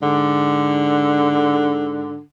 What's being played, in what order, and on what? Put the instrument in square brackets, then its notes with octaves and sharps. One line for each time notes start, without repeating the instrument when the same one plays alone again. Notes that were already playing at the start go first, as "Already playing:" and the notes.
[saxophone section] G#2 D3